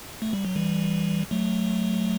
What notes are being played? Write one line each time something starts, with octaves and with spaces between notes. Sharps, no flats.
A3
G3
F#3
E3 G3
F#3 A3